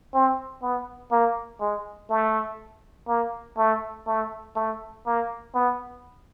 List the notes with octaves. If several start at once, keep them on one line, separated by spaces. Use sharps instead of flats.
C4
B3
A#3
G#3
A3
A#3
A3
A3
A3
A#3
B3